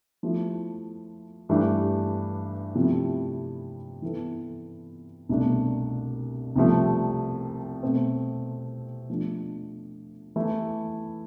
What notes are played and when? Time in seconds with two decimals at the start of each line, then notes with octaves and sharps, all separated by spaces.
0.23 F3 A3 E4
1.49 G2 E3 A3 D4 G4
2.75 C3 F3 A3 E4
4.02 E3 B3 E4 A4
5.29 C2 B2 A3 D4
6.56 C2 C3 F3 A3
7.83 B2 A3 C4
9.10 F3 A3 D4
10.36 E3 A3 E4